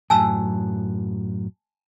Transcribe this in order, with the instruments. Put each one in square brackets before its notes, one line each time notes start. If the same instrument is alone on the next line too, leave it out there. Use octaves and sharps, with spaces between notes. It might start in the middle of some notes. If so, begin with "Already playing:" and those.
[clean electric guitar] F#2 A2 F#3 [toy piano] G#5 A5 E6